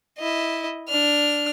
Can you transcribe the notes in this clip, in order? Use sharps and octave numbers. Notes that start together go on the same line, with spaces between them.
E4 D#5
D4 F6